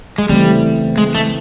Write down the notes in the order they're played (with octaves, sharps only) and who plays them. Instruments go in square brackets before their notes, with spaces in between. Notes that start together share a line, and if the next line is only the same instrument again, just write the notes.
[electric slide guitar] G#3
[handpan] C#3 E3 A3 C4 [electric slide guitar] G3
[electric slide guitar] G#3
A3